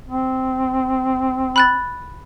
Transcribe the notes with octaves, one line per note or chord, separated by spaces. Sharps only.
C4
B5 F#6 A6